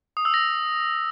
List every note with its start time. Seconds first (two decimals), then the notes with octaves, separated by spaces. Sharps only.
0.17 D#6
0.25 E6
0.34 A#6